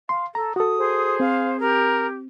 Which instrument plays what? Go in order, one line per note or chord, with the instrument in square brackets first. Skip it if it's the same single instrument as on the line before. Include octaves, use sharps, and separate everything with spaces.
[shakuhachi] F5 [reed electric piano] C6
[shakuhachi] A4 [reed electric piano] A#5
[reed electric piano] F#4 A4 [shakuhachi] D#6
[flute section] G#4 C5
[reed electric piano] C4 [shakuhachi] F5
[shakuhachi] G4 [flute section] A#4